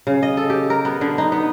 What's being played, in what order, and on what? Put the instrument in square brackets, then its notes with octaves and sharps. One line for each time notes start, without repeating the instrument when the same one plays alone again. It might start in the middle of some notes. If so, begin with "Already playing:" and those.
[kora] C#3
D#5
A4
G4
A#4
B3
D3
D#4
B3